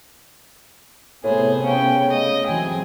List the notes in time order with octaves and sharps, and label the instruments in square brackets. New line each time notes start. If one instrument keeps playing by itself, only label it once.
[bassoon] A2 [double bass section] C3 A3 B3 [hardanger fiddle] G#4 C5
[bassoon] C#3 [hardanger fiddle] C#4 G5
[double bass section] A3 [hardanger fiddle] D#5
[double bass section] E3 F#3 C4 [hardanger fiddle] G#4 G5